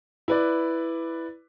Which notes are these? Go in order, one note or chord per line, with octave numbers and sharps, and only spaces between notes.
E4 B4 D5